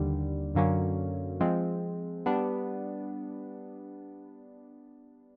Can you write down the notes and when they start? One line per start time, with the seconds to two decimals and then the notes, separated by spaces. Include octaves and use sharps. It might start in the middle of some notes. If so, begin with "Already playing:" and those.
Already playing: D#2 D3 G3
0.55 F#2 D3 F#3 A#3 C#4
1.40 F3 G#3 C4
2.26 G3 B3 D4